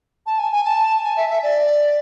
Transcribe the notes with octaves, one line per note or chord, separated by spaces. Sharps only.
A5
G#5
G#5
A5
G#5
E5
E5
D5